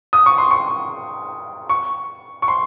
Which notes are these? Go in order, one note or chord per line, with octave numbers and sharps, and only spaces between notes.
D#6
C#6
C6
C#6
C#6
C#6
C6